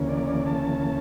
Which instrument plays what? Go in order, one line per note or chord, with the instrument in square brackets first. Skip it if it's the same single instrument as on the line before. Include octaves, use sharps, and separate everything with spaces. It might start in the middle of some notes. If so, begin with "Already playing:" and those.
Already playing: [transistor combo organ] D2 C#3 E3 A#3 C#4
D5
D5
A5